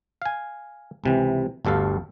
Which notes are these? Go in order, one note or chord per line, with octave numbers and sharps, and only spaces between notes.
F5 G#5
C#2 C3 E3
G1 D2 G2 A4 F5